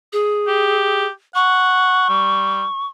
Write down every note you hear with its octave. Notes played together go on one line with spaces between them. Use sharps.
G#4
G4
F#5 C#6
G3